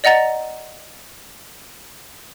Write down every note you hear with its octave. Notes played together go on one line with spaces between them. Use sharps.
D5 D#5 F#5 A#5 A6